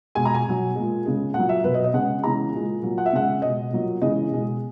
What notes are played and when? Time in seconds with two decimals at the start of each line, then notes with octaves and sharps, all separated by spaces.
0.15 B2 G#3 G#5
0.25 A#5
0.34 G#5
0.45 B2 F#3
0.75 A#2 G#3
1.06 C#3 G#3
1.34 A#2 F#5
1.39 F#3
1.49 E5
1.64 B2 F#3 B4
1.74 D#5
1.84 D#5
1.93 C#3 G#3 F#5
2.23 C#3 E3 G#3 A#5
2.53 A#2 G#3
2.82 A#2 F#3
2.98 F#5
3.06 E5
3.13 C#3 G#3 F#5
3.42 B2 G#3 D#5
3.71 A#2 F#3
4.02 C#3 E3 G#3 D#5
4.31 B2 G#3